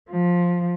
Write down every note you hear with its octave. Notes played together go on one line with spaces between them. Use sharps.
F3